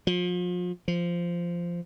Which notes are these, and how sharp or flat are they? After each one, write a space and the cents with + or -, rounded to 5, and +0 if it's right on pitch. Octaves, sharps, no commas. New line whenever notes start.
F3 +35
F3 -10